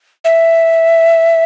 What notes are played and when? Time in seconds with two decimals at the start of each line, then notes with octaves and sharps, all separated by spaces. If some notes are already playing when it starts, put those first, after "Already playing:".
0.25 E5